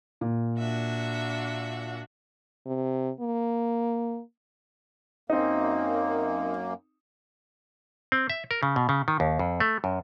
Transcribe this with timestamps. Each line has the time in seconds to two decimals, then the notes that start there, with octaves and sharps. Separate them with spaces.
0.21 A#2
0.58 D4 F#4 E5
2.66 C3
3.20 A#3
5.30 F#2 A#3 C4 D#4
8.12 C4
8.30 E5
8.51 A#4
8.63 C#3
8.76 B2
8.89 C#3
9.08 D#3
9.20 D#2
9.39 F2
9.60 A3
9.84 F#2